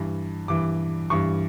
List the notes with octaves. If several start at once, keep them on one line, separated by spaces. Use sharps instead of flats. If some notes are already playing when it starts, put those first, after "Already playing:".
Already playing: G2 E3
G2 E3 D6
G2 E3 C#6